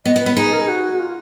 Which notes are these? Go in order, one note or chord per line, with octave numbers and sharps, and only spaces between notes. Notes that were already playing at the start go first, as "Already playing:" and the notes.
B3 D#5
B3
B4
B3
D#4 G#4
A#4
G#4
F#4
F4